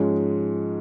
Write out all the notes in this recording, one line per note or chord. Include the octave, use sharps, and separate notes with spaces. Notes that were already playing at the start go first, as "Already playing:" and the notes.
Already playing: G#2 F3 G#3 C#4